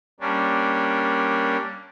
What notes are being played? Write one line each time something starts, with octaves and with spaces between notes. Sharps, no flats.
G3 A#3 C#4 D4